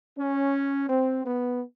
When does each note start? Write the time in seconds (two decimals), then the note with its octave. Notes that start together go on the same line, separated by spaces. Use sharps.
0.18 C#4
0.89 C4
1.25 B3